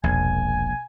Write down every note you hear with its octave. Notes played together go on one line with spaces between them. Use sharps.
E1 A#1 G#5